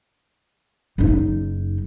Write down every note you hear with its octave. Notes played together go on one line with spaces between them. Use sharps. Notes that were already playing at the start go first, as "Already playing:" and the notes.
F#1 D#4